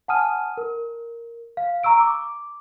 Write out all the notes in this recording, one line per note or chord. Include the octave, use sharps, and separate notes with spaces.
F#5 G#5 A5 D#6 F6 D#7
A#4
F5
A#5 C#6 E6 D7
D6